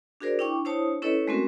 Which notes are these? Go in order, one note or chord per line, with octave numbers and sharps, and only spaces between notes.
D4 F#4 G#4 A#4 C5 D5
D4 E4 G5 C#6 D6
D4 E4 C5 C#5 A5 D#6
C#4 E4 A4 B4 C#5 D#5
G#3 A3 C4 C#4 F#4 A#4